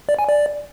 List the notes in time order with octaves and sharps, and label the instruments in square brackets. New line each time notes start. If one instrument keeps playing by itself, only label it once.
[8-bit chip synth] D5
G#5
D5